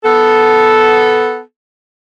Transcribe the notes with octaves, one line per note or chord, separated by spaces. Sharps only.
B3 A4